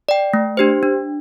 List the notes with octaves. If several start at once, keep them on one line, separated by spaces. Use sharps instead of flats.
D5 G5
A3
D4 G4 C5
D4